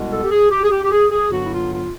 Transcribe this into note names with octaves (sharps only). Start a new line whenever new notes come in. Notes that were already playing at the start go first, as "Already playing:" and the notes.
Already playing: C2 B2 G#3 B3
A4
G4
G#4
G4
G#4
G4
G4
G#4
G#4
G2 D3 F#3 B3 F#4
E4
F4
F4